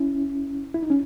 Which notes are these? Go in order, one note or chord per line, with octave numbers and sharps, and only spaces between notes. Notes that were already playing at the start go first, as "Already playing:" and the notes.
Already playing: C#4 E4
E4
D#4
C#4